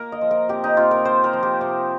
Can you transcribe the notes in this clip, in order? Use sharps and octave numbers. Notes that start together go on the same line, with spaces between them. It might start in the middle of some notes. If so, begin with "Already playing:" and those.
Already playing: A#3 A#4
D#5
F3
A#4
C3 G4
D#4
C3 F4
A#4
C4 C5
A#4
F3
G4
C3